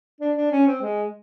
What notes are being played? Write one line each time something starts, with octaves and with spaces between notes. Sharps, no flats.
D4
D4
C#4
C4
G#3